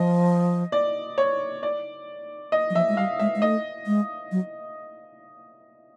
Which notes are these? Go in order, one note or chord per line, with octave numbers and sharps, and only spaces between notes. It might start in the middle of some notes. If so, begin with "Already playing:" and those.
Already playing: F3 D#5
D5
C#5
D5
D#5
F#3
F3 E5
G#3
G3 F5
G#3 E5
G#3
A3 D#5
G#3
F#3